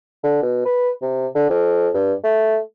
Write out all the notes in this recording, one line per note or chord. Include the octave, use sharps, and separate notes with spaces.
D3
B2
B4
C3
D3
F2
G2
A3